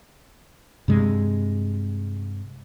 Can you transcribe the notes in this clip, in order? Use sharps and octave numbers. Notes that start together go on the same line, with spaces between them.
G2 C3 G#3